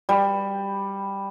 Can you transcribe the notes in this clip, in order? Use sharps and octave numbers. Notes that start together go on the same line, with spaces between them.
G3